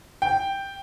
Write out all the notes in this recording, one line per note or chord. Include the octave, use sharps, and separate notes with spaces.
G5